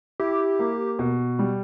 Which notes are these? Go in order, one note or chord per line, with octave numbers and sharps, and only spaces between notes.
E4 G4
A#3
B2
G3